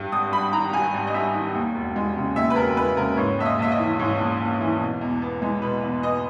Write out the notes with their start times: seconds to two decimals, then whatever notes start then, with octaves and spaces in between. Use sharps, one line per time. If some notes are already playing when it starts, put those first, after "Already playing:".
Already playing: G2
0.12 G#1 D#6
0.32 G3 B5
0.53 D#3 A#5
0.73 G2 G#5
0.94 G#1
1.07 D#5
1.14 G3 E5
1.35 D#3
1.55 D#2
1.74 E1
1.96 G#3
2.16 C#3
2.36 D#2 E5
2.50 B4
2.56 E1 A#4
2.77 G#3 B4
2.97 C#3 A#4
3.17 G#2 C#5
3.38 A#1 E5
3.45 D#5
3.59 A#1 E5
3.72 D#5
3.79 E3
3.99 G#2 C#5
4.19 A#1
4.40 A#1
4.60 E3
4.81 B2
5.01 E2
5.22 B3
5.42 G#3
5.62 B2 B4
5.82 E2
6.03 B3 D#5